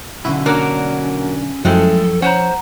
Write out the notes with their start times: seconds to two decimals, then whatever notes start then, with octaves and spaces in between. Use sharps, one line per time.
0.25 B1 D3 C#4 E4 F#4
0.46 F#3 A#3 D4 A#4 F#5
1.65 F#2 F3 G#3 A3 E4 A4 G5
2.22 C#4 C5 F#5 A#5